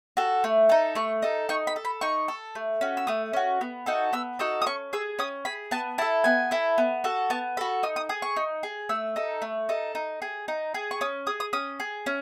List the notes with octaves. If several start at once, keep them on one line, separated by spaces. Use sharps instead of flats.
F#4 A4
A3
D#4 A4
A3 C#6
D#4 A4
D#4 C#6
B5
A4
B5
D#4 C#6
A4
A3
C#4 F#4
E6
A3 D#6
C#4 F#4
B3
D#4 F#4 A4
B3 E6
D#4 F#4 A4 D#6
D#6
C#4 C#6
G#4 E6
C#4 D#6
G#4 B5
B3 A5
E4 A4 A5
B3 G#5
E4 A4
B3
F#4 A4
B3 A5
F#4 A4 B5
D#4 D#6
D#6
G#4 D#6
C#6
D#4
G#4
A3 E6
D#4 A4
A3
D#4 A4
D#4
G#4
D#4
G#4
C#6
C#4 D#6
G#4 D#6
D#6
C#4 D#6
G#4
C#4